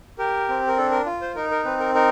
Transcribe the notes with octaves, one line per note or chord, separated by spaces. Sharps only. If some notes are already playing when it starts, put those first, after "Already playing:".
G4 A#4
C4
A#4
D4 A4
A#4
F4
C5
D#4 A#4
A#4
C4 B4
A#4
D#4 A#4